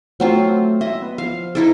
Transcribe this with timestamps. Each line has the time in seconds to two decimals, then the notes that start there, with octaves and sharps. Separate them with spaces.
0.20 F#3 A3 C4 F4
0.81 D#5 E5
1.02 B3
1.18 F3 F5
1.55 D#4 E4 A4